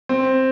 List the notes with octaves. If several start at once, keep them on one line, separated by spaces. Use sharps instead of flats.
C4